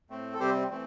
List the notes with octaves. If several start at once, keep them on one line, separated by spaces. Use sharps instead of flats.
A2 A3 C4
A4
C3 G3 C4 G4 C5
E3 A3 C4